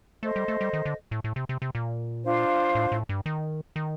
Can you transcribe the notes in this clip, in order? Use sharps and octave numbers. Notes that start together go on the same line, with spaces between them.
A3 A4 C5 D#5
G3
A3
G3
D#3
D3
A2
A2
C3
C3
C3
A#2
D4 F4 C5 F5
A2
A2
G2
D#3
D#3